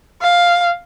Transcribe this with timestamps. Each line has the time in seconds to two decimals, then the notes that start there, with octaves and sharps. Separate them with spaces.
0.21 F5